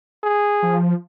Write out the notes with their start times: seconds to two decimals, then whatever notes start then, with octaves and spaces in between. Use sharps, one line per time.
0.23 G#4
0.63 F3